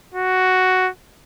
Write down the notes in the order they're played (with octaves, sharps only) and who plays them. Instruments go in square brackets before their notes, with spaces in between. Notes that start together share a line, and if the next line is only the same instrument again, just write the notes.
[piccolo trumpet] F#4